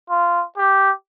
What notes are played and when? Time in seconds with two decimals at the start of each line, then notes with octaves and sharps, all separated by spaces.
0.10 F4
0.58 G4